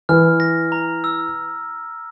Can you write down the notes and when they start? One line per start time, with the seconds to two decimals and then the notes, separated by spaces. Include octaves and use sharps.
0.09 E3 F6
0.40 A#6
0.72 A#5
1.04 E6